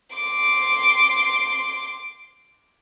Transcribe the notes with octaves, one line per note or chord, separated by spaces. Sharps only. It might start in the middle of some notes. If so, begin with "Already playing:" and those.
C6 D6